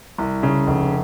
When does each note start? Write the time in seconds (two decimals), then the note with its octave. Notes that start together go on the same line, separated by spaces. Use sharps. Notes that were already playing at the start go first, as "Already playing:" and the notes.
0.18 C2
0.43 C#3
0.67 F1